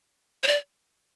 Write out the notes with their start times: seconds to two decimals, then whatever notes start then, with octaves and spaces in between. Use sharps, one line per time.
0.43 C#5
0.47 D5